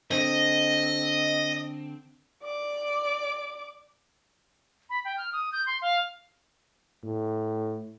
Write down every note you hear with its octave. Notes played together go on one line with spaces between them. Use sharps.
D3 C4 D#5
D5 D6
B5
G5
F6
D#6
G6
C6
F5
A2